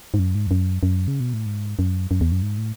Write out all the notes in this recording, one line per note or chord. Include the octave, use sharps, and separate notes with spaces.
G#2
F#2
G#2
E2
F#2
F#2
C#3
B2
A2
G#2
F#2
F#2
E2
F#2
G#2
A2